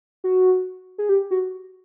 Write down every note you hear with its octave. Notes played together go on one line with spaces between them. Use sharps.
F#4
G#4
G4
F#4